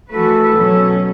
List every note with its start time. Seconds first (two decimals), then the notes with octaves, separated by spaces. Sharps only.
0.11 E3 A3 F#4 A4 B4
0.57 B2 F#3 C#4